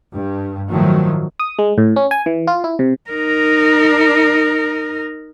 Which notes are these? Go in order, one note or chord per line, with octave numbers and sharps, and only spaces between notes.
G2
A2 D#3 F3 F#3 A3
D#6
G#3
A2
C#4
G#5
E3
F4
E4
C3
D#4 A#4